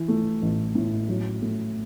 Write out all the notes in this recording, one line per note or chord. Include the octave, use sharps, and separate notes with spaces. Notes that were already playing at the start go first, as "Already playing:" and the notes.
Already playing: E3
A3
A1
A2
F#3
A3